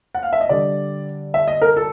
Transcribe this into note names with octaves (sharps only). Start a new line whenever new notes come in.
F#5
F5
E5
D#5
D3 G3 D5
E5
D#5
A#4
A4